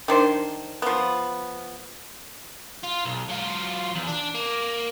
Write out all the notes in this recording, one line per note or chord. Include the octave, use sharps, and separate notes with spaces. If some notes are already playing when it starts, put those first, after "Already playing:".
D#3 D4 C5
F3 B3
F4
B1
F#3 F4
E2
D4
A#3